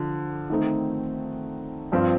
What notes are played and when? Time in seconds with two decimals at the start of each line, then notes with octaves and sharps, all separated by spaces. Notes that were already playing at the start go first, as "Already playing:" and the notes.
Already playing: D3 F3
0.50 D#3 A3 C4 D#4
1.92 G2 F3 C4 F4